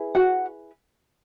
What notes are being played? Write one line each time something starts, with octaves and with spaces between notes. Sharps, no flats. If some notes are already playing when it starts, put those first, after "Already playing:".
Already playing: E4 G#4 B4
F#4 F#5